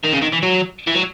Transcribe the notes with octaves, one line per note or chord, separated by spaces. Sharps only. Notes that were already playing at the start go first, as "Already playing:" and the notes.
D#3
C#3
D#3
E3
F#3
E3
F#3